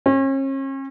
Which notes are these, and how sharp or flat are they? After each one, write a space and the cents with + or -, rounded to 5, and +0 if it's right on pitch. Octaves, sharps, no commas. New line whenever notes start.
C#4 -40